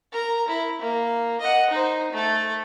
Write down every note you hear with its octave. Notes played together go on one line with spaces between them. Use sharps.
A#4 A#5
E4
A#3
D#5 F#5
D#4 C5
A3 A4